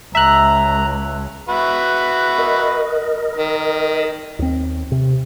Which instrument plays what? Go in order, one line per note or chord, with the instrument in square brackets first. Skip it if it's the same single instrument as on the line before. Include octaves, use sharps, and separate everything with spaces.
[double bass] C#2 [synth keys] E5 F#6 [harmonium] A#5
[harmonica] F#4 B4 E5
[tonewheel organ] A#4 D#5
[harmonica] D#3
[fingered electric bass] D#2 C4
C3